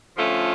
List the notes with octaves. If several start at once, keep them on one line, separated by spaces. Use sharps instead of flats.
D3 F3 A3 C#4 F4